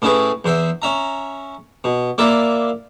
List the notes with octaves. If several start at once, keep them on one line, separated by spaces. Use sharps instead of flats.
A2 C#4 E4 G#4 B4
E2 C5 E5
C#4 E5 A#5
B2
A#3 E4 F4 D5 E5